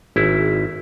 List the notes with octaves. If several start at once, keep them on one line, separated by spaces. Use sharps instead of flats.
G#1 E4